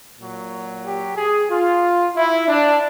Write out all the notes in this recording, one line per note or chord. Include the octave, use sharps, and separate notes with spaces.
A#2 F#3
G4
G#4
F4
E4
D4